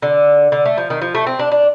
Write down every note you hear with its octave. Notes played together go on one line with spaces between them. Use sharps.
D3
D3
A3
F3
D#3
F3
A3
C4
D4
D4